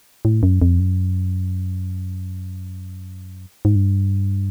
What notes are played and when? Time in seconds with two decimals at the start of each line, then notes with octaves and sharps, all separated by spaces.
0.25 A2
0.43 F#2
0.62 F2
0.80 F#2
3.65 G#2
3.76 G2